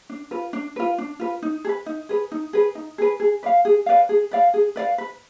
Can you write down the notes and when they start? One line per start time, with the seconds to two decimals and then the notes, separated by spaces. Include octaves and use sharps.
0.09 D4
0.31 F4 B4
0.53 D4
0.76 F4 B4
0.98 D4
1.19 F4 B4
1.42 D#4
1.65 G#4
1.69 B4
1.86 D#4
2.09 G#4 B4
2.32 D#4
2.53 G#4 B4
2.75 D#4
2.98 G#4 B4
3.20 G#4
3.43 B4 D5 F5
3.65 G#4
3.86 B4 D5 F5
4.09 G#4
4.31 B4 D5 F5
4.54 G#4
4.76 B4 D5 F5
4.98 B4